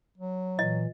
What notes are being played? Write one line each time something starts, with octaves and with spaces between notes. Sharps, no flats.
F#3
A#2 E3 D#5